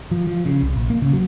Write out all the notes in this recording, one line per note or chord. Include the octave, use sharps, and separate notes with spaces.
F3
F3
C#3
C2
A#1
A#3
C#3
F#3